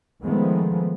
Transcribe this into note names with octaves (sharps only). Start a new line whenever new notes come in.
D#3 F3 G#3 A3 B3